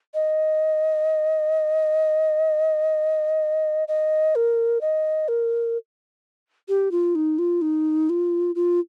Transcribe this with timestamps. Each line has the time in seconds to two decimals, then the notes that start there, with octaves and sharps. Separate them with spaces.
0.14 D#5
3.88 D#5
4.35 A#4
4.81 D#5
5.28 A#4
6.68 G4
6.91 F4
7.15 D#4
7.38 F4
7.61 D#4
8.09 F4
8.55 F4